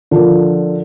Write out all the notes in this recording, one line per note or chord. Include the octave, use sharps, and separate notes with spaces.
D3 F3 F4 A#4